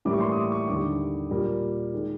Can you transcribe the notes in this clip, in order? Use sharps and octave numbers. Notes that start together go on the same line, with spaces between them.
A2 E3 G3 A#3 D6
C#6
C6
D#6
D6
C#6
D#2 D3 G3 D6
A#2 G3 A#3
D#3 G#3